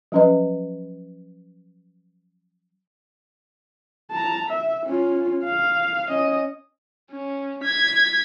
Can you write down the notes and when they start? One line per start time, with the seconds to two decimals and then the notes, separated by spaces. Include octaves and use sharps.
0.12 F3 F#3 C#4 B4 D#5
4.11 A5 A#5
4.48 E5
4.85 C#4 F4
5.45 F5
6.09 C#4 D#5
7.11 C#4
7.64 G#6 B6